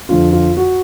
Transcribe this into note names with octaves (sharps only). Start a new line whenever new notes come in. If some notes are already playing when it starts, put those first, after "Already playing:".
F2 D3 F4
F4
F#4